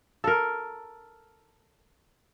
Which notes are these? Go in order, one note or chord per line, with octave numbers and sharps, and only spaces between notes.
A4 A#4